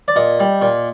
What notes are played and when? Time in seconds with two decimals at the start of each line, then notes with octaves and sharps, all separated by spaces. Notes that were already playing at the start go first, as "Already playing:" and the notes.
0.08 D5
0.16 A#2 D#5
0.40 G3
0.62 A#2